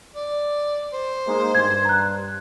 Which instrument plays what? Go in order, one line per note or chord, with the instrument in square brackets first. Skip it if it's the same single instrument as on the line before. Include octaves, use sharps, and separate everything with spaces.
[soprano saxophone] D5
C5
[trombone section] G#3 A#3 D#4
[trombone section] G2 [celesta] G#6
[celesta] A#5 F#6